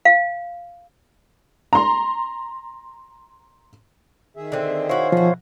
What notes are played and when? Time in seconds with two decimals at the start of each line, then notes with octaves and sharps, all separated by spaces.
0.05 F5
1.73 A#5 C6
4.37 D#3 G#4 E5
4.52 D3 C4
4.90 E4 F#4 C5 C#5 F5
5.12 B2 F3 F#4